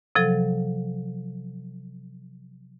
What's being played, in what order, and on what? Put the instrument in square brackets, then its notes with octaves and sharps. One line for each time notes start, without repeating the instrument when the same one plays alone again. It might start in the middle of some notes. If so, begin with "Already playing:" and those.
[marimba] C3 F3 F#3 A4